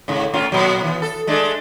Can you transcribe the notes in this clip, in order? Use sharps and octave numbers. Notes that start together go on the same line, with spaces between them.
G#2 C#3
A2 C#4 F4
A#2 F#3
E3 B3
A4
G#3 A3 D4